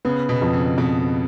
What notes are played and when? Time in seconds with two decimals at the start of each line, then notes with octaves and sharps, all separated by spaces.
0.05 C#3 B3
0.29 B2
0.41 F2
0.53 C#3
0.77 F2 B2